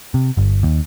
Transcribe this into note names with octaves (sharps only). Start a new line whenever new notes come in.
C3
G1
D#2